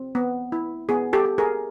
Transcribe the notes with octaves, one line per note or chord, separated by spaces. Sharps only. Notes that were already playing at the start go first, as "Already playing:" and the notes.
Already playing: C4
B3
E4
B3 G#4
G4 A4
G4
G#4 A#4